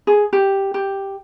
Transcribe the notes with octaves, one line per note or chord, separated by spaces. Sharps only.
G#4
G4
G4